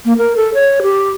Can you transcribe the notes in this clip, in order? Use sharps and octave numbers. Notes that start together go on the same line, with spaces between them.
A#3
A#4
A4
C#5
G4